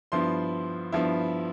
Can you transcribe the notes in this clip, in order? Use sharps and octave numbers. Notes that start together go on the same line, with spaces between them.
G2 F3 B3 E4 C6
G2 F3 B3 E4